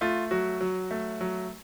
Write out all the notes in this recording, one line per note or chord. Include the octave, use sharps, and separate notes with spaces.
A3 F4
F#3 F#4
F#3
A3
F#3